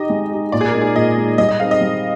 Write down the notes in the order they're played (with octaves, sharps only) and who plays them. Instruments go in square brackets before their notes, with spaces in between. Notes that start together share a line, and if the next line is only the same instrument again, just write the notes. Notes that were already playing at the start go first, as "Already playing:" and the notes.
Already playing: [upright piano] D#4 G4 [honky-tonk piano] D#5
[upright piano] G#3
D#4 G4
[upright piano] A#2 [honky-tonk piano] D5
[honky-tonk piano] G#4
A#4
[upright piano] G#3 D#4
[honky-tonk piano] G#4
[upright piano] A#2 [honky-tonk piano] D#5
[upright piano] G#3 D#4
[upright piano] G3 [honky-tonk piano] D#5
[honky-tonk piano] D#5
[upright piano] C4 D#4 G#4 [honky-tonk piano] F5
[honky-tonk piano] D#5
[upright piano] G3